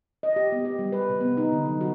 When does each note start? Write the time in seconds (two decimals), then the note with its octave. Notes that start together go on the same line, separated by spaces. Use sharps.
0.23 D#5
0.36 G4
0.52 B3
0.65 G4
0.79 G3
0.92 B4
1.09 C3
1.21 B3
1.37 D#4
1.52 D3
1.65 F#3
1.81 F#4